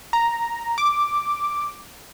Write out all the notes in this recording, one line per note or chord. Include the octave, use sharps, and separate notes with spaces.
A#5
D6